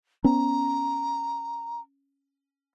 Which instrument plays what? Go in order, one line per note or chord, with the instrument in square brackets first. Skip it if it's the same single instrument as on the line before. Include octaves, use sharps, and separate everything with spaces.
[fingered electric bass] B3 C#4 [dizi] A#5